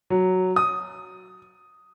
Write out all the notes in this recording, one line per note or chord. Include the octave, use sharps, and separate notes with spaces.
F#3
D#6